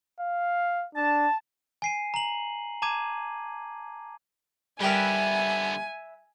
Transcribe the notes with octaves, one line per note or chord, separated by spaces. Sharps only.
F5
D4 A5
G#5 C7 D#7
A#5 F#7
A5 A#5 D6 G#6 D#7
D3 G3 B3 G4 A#4 B4 E5 G#5